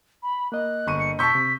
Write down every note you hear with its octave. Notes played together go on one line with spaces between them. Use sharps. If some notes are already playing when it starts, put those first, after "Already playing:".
B5
A#3 D#5 F#6
G1 C#6 D#7
C#7
B2 A5 C#6 E6 G6 B6
C3